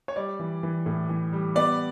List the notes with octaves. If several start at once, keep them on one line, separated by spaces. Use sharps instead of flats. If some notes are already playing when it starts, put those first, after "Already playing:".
C#5
G3 D5
E3
E3
A2
E3
G3
B3 D5